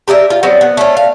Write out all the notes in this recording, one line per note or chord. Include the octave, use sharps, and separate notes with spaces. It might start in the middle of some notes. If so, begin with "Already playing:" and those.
G4 A#4 D#5 E5
F4
F#3 G3 B3 C4
B3
A3 C#4
F5